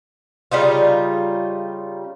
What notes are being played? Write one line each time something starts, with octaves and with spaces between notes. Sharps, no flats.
C#3 G3 D#4 F4